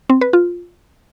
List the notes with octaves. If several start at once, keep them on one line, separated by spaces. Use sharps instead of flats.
C4
B4
F4